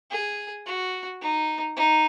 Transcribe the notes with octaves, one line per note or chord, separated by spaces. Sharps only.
G#4
F#4
D#4
D#4